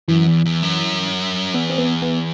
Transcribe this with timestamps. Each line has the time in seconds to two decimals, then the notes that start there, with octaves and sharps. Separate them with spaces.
0.08 F#2 E3
0.27 E2
0.46 E2
0.63 F#2
1.54 E2 B3
1.70 C4
1.78 B3
2.02 B3